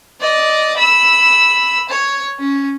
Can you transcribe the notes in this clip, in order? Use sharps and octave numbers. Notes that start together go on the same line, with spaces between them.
D5 D#5
B5 E6
C#5
C#4